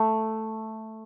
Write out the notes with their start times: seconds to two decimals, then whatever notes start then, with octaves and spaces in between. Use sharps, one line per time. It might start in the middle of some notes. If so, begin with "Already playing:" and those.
Already playing: A3